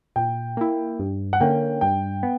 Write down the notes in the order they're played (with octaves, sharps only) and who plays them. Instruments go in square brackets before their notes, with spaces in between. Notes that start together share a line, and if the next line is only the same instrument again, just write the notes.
[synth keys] A#2 [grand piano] G5
[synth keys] A#3 E4
G2
[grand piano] F#5
[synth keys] D3 A#3 C#4 [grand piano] G5
[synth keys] G2 [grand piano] G5
[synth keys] B3